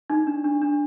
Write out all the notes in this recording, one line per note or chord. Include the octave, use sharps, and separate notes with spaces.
D#4
D4
D4
D4